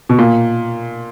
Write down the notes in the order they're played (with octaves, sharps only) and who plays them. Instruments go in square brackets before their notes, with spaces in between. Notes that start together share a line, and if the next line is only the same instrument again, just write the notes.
[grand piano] B2
A#2